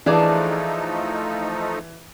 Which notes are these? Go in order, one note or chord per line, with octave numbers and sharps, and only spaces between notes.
E3 F3 A3 D4 D#4 G#4 D5